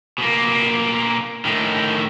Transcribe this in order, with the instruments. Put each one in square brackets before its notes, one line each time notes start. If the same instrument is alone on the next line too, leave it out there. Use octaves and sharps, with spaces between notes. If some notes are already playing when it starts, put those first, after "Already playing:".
[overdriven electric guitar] B2 A#3
A2 D#3